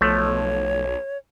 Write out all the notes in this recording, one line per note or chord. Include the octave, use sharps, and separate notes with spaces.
B1 F3 A3 C#5